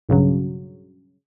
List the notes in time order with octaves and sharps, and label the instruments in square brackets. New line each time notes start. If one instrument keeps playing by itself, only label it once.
[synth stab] B1 G2 C#3 F#3